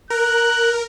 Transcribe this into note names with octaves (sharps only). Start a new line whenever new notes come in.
A#4 F#6